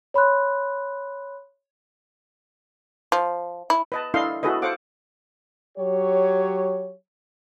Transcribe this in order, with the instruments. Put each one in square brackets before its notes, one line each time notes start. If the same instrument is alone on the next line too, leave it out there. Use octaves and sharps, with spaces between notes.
[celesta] C#5 B5 C6 F#6
[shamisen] F3
E4
[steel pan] B4 D#5 A5
D4 E4 A4 D#5 F5 C6
E4 F#4 G#4 A4 B4 D#5
A4 C5 F5 F#5 D6
[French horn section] F#3 G4 C#5